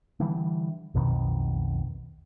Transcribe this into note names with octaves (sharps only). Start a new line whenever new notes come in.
D3 E3 G3
B1 F2 B2 D#3